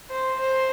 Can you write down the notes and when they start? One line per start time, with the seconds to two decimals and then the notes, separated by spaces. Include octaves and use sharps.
0.10 C5
0.40 C5